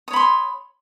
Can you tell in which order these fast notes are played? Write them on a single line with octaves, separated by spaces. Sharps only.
D#6 C#5 B5 C6